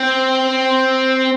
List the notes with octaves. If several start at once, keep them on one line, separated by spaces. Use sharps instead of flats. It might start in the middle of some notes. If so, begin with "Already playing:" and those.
Already playing: C4